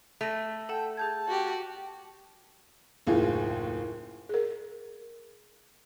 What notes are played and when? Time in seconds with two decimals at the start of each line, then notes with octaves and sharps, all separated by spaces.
0.21 A3 A#6 D#7 F7
0.69 A4 F#5 G5 A5
0.97 G#4 A5 G6 G#6
1.28 F#4 G4
3.07 F#1 D#2 A2 F4 G#4
4.29 G#4 A#4